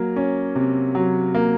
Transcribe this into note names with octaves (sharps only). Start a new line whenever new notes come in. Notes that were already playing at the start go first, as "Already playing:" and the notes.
Already playing: F#3 A#3
C#4
C3
F#3
A#3